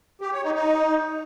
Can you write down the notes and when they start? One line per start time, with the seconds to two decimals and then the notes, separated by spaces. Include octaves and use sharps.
0.21 G4
0.32 C#5
0.44 D#4
0.55 D#4